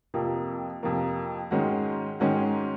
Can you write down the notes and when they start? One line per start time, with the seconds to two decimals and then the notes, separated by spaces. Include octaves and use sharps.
0.14 F2 C3 F3 A#3
0.83 F2 C3 F3 A#3
1.51 G#2 D#3 G#3 C#4 F#4
2.20 G#2 D#3 G#3 C#4 F#4